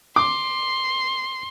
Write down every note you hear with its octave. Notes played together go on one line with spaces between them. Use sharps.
C6 D6